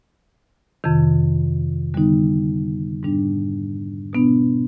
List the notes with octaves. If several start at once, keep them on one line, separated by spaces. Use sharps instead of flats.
F2 C3 D#3
D3 G3 B3 D#4
G#2 G3 B3 D4
B2 B3 D4